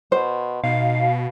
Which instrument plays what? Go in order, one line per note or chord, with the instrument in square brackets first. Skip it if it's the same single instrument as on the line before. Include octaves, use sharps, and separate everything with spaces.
[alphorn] B2 [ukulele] C5
[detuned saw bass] B2 [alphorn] D#4 [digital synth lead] F5